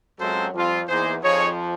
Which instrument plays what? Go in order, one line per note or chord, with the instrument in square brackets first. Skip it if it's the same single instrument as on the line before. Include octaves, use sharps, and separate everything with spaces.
[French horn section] F#2 F#3 [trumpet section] G#3 C4 F4 A4 C5
[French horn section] F2 F3 [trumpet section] G3 C4 F4
[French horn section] E2 E3 [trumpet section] A#3 D#4 G#4 C5
[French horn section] F2 F3 [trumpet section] D#4 G#4 C#5